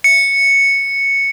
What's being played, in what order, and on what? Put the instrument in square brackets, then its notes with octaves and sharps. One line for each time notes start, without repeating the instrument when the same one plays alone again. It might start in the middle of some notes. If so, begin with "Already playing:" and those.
[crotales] C#7